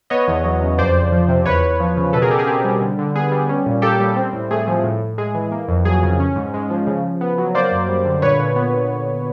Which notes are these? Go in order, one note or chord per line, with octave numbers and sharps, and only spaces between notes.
B3 C#5 D#5
E2
F#3
C#3
F2 C5 D5
F2
F3
C3
E2 B4 C#5
E2
F3
C#3
B2 A4 B4
G#4 A#4
B2 G4 A4
G#4
C4 G4
G3
D3
D3
B3 G#4
G3
C#4
A#2
A#3 G4 A4
G3
C4
A2
A3 G#4
F3
A2
A2
G#3 G#4
E3
A#3
F2
F#3 G#4
C#3
C#4
G#2
G#3
F3
C#3
C#3
B3
F#3
A#3 C5 D5
F#2
G3
D3
A#2 B4 C#5
A#2
B3